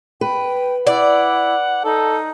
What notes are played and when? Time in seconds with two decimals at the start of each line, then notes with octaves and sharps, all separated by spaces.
0.21 B4 G5
0.87 E4 D5 F#5
1.84 D#4 A4